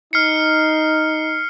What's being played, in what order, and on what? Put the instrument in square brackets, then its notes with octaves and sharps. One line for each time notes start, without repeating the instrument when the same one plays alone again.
[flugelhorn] D#4 [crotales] F6 C7 C#7